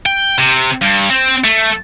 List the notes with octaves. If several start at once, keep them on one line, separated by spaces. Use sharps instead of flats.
G5
C3
G2
C4
A3